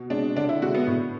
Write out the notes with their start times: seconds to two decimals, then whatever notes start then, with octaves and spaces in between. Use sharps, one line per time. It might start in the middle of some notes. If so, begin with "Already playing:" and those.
Already playing: B2
0.10 G#3 D4
0.36 D3 D4
0.49 E4
0.62 G#3 F#4
0.75 B3
0.87 A2